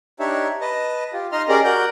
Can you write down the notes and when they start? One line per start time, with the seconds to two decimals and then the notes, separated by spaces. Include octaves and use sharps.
0.20 D4 D#4 G4 C#5 E5
0.61 B4 D#5 A5
1.13 F4 G4
1.32 D#4 D#5 C6 F6
1.49 C#4 G4 G#4 A#4 D5 D#5
1.64 F#4 A#4 D5 G6